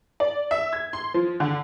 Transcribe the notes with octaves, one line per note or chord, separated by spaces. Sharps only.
D5
E5
G#6
C6
F3
D3